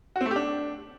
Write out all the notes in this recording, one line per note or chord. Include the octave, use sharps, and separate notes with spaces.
F#4
C4
A3
G4
D4